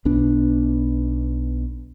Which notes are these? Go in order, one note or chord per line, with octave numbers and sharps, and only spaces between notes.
B1 B2 D4